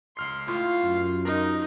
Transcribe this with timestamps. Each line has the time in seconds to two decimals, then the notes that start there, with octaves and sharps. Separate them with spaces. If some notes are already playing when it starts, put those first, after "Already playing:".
0.17 C#2 C6 F6 C7
0.48 A2 F4 F5 C6
0.83 F#2
1.25 D#4 A#4